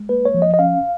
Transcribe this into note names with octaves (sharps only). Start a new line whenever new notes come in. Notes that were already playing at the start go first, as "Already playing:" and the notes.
Already playing: G#3
A#3 B4
C#5
F3
D#5
D#5
C#4 F5